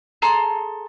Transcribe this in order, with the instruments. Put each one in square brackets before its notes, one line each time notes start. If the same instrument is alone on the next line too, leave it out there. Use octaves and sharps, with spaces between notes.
[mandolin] G#4 A4 A#5 C6